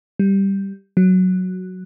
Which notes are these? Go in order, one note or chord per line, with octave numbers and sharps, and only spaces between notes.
G3
F#3